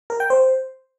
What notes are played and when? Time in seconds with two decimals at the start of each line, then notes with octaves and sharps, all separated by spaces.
0.10 A#4
0.20 G5
0.30 C5